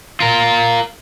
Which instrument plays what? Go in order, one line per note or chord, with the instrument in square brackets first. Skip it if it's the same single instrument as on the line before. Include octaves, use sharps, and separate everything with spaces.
[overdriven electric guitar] F4 A#4